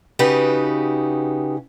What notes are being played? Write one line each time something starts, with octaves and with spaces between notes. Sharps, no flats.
C#3 D#4 F#4 G4 B4